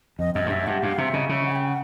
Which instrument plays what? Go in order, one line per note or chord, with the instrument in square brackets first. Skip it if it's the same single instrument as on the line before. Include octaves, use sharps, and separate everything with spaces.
[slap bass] F2 [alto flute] D#5
[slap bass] F#2 [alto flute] D#5
[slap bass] G2
[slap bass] F#2 [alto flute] E5
[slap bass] G2 [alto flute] F#5
[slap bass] G2 [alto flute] F5
[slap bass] C3 [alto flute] E5
[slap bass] C#3 [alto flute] D#5
[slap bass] C#3 [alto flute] E5
[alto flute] F#5
G#5
G5
F#5